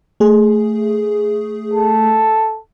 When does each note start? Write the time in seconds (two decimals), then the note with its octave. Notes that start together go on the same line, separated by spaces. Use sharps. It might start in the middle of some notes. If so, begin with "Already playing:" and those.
0.20 A3 G#4
1.73 A4